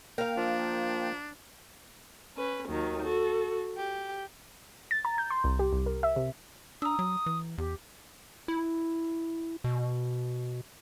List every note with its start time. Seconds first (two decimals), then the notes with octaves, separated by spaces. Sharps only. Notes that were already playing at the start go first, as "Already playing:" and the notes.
0.18 A#3 A#4 F5 G5
0.37 F3 D4
2.37 C#4 B4
2.68 D#2 D#3 F#3
3.02 F#4 A4
3.76 G4
4.91 A6
5.05 A#5
5.18 G6
5.30 C6
5.44 C2
5.59 G4
5.73 C2
5.86 A#4
6.03 E5
6.16 C3
6.82 D4 A#5 D#6 E6
6.99 F#3
7.26 E3
7.58 E2 G4
8.48 E4
9.64 B2